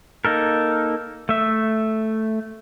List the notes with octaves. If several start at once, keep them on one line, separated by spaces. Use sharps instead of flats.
A#3 D#4 A4 A#4
A3 E5